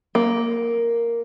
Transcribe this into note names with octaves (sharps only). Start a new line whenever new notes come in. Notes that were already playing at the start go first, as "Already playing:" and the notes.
A#3